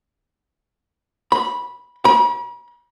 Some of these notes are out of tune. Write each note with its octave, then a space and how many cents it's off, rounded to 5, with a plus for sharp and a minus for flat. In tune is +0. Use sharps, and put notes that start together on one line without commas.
B5 -15
B5 -45